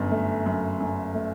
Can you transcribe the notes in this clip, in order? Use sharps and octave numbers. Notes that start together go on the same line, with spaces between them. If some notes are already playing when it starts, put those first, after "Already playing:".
Already playing: G1 F#2
A3
F#2
F#2
A3